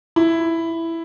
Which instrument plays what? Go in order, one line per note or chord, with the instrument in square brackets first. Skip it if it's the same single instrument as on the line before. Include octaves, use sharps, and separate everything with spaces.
[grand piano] E4